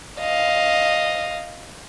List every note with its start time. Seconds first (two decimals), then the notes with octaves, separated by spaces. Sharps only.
0.20 D#5 F5